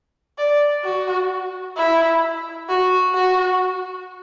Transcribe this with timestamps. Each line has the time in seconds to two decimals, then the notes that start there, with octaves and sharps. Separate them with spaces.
0.38 D5
0.84 F#4
1.77 E4
2.69 F#4
3.14 F#4